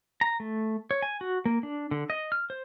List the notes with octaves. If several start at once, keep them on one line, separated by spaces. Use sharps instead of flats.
A#5
A3
C#5
G#5
F#4
A#3
D4
D3
D#5
F6
C5